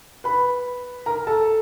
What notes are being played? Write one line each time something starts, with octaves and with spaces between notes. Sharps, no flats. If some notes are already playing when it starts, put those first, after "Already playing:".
B4 B5
A#4 A#5
A4 A5